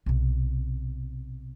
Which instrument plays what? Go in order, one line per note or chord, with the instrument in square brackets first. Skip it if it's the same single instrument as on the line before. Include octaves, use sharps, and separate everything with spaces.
[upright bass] B1 C3